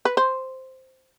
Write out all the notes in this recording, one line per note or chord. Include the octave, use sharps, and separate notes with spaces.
B4
C5